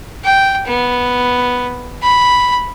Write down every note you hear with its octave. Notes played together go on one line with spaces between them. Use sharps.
G5
B3
B5